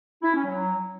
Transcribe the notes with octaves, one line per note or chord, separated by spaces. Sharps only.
E4
C#4
F#3